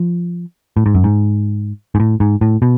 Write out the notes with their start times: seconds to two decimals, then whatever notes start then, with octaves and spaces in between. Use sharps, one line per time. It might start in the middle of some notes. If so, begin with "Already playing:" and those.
Already playing: F3
0.77 A2
0.86 G#2
0.95 F#2
1.04 G#2
1.95 G#2
2.00 A2
2.20 G#2
2.41 A2
2.62 B2